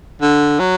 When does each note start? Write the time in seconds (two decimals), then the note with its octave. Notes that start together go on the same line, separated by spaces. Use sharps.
0.21 D3
0.59 F#3